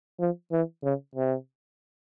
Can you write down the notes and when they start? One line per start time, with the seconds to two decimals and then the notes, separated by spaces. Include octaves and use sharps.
0.20 F3
0.52 E3
0.83 C#3
1.15 C3